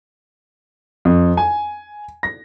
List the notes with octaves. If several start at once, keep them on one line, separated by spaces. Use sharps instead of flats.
F2
G#5
A#6